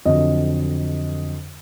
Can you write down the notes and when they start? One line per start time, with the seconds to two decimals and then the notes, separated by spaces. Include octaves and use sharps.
0.06 F2 D3 F#3 D#5